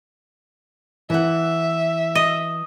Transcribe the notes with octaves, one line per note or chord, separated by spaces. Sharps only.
E3 E5 F#5
D#5